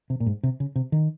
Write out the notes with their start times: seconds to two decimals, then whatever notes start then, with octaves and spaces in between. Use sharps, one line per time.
0.10 C3
0.20 A#2
0.26 G#2
0.43 C3
0.60 C#3
0.76 C3
0.92 D#3